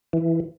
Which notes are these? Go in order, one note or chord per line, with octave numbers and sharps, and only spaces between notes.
E3